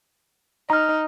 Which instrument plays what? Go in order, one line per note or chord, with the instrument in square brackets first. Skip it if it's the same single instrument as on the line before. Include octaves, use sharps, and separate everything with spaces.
[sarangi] D#4 [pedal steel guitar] A#5 F6